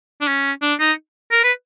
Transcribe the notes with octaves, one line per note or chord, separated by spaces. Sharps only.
D4
C#4
D4
D#4
A#4
B4